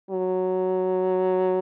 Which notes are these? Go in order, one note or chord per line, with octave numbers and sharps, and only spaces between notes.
F#3